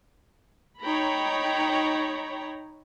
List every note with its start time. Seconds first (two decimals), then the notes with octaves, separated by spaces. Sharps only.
0.81 D#4 C#5 G5 A#5 B5